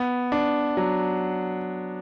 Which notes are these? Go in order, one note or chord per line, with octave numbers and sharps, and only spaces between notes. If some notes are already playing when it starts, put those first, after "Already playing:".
Already playing: B3
D4
F#3